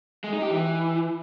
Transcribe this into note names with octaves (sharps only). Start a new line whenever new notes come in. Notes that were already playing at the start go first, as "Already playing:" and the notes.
G#3
D#4
G4
E3